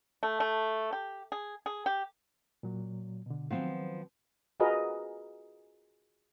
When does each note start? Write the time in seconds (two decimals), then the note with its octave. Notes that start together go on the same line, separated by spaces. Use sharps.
0.23 A3
0.40 A3
0.93 G4
1.32 G#4
1.66 G#4
1.86 G4
2.63 A#2 F#3
3.26 B2 D3
3.51 D#3 F3 F#3 B3 C4
4.60 F4 F#4 G#4 A#4 B4 D#5